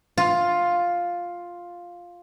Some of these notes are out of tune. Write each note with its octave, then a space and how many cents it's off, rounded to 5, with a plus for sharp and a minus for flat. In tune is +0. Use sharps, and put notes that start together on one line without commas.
F4 +5